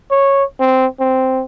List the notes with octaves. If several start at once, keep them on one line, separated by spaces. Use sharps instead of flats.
C#5
C4
C4